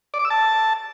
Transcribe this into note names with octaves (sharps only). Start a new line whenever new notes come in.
D5
D6
E6
A5